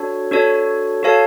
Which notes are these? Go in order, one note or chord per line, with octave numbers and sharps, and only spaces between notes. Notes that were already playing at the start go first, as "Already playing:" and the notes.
Already playing: D4 F#4 A4 C#5
D4 F#4 A4 C#5
F#4 A4 C#5 F5 A5